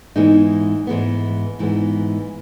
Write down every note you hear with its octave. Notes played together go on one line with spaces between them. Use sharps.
G#2 E3 G#3 B3 D#4
G#2 E3 G#3 B3
G#2 E3 G#3 B3